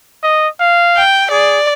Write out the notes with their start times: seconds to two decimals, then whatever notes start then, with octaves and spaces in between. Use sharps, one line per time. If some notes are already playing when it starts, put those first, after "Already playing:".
0.23 D#5
0.60 F5
0.97 G5
1.31 G#4 D5